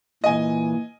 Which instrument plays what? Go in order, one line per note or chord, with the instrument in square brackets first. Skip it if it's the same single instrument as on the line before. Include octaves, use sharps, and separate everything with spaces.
[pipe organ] A#2 E3 [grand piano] D#5 G#5